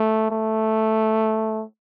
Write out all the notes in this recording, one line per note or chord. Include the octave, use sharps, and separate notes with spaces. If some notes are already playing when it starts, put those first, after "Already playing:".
Already playing: A3
A3